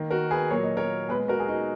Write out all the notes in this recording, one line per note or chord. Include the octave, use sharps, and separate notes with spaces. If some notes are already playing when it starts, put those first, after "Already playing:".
Already playing: D#3 A#3
F#4 A#4
G#4 B4
A#2 F#3 A#3 C#5
D#5
A#4 C#5
A#2 G#3 B3 G#4 B4
F#4 A#4
G#4
D#4 F#4